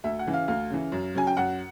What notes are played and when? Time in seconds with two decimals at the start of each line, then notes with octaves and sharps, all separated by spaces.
0.04 D2 E5
0.19 F#5
0.27 C#3 E3
0.33 F5
0.48 D2 F5
0.70 C#3 E3
0.92 F#2
1.15 C#3 F#3 G#5
1.27 G5
1.37 F#2 F#5